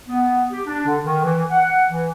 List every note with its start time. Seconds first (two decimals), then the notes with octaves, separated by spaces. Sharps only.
0.09 B3
0.51 G4
0.67 D4
0.86 D3
1.03 D#3
1.24 E3
1.50 F#5
1.90 E3